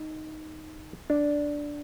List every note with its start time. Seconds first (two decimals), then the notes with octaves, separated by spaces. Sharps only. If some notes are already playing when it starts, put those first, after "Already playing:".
Already playing: D#4
1.10 D4